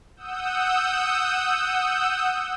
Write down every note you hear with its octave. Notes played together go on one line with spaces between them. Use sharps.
F#5 D#6 E6 G6